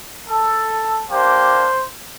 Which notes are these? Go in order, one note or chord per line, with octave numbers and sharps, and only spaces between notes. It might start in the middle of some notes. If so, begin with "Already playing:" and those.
A4
A#3 D4 G4 C5